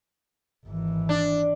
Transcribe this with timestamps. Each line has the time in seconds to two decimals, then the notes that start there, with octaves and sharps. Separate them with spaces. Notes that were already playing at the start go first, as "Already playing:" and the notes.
0.66 G#1 E3
1.09 D4